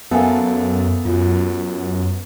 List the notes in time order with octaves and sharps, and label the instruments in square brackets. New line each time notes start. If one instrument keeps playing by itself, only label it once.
[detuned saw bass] F#2 [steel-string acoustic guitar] A#3 A4 [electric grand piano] B3 [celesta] E5 F#5 G#5
[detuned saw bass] F#2 [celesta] F4